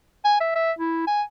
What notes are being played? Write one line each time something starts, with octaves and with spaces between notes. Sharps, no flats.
G#5
E5
E5
E4
G#5